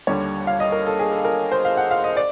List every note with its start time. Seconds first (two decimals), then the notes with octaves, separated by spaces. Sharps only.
0.07 D#2 D3 G3 C#5
0.47 F5
0.60 D#5
0.72 A#4
0.86 A4
1.00 G#4
1.13 A4
1.24 A#4
1.52 C5
1.65 F5
1.77 F#5
1.91 F5
2.04 D#5
2.17 D5